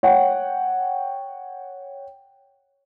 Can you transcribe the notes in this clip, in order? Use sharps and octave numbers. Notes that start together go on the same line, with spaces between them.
C#5 F#5 G5